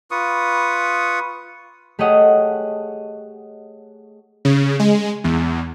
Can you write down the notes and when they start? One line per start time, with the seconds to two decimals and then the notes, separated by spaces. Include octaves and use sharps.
0.11 F4 B4 C#6 D#6
1.99 A3 G4 G#4 C#5 D#5 F#5
4.45 C#3
4.79 G#3
5.24 E2